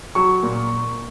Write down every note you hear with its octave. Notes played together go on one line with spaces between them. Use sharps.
F#3 C#6
A#2